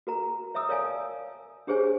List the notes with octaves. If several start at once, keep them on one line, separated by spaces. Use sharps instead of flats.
F#4 A#4 A#5
C#5 E5 A#5 D#6 E6
A#4 C#5 D5 F5 G#5 A5
D4 G4 G#4 C5 C#5 G#5